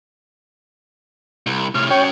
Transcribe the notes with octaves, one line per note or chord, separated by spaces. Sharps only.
C2
A2 C3 F6
C#4 F#4 C#5 G5